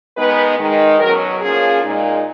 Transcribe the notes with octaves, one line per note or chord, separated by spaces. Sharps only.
D#3 G#3 B3 D#4 B4
D#3 G#3 D#4
B2 F#3 C#4 A#4
F3 A#3 C#4 G#4
A#2 G#3 D#4